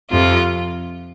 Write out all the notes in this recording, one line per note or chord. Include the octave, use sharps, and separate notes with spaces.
F2 C3 F3 F4